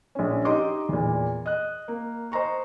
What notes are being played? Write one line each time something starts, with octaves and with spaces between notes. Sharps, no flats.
A#1 C#4
D#4 G4 D#5 C6 D6
E2 A#2
D#5 F#6
A#3
C5 D#5 A#5 C#6